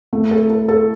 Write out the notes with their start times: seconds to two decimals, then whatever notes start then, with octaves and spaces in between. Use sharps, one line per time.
0.13 A3
0.31 A4
0.50 A4
0.68 A4